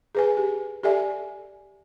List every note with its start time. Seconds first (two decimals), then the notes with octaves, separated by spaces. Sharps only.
0.15 G#4 B4 G#5
0.37 G4
0.83 G4 A4 D5 E5 G#5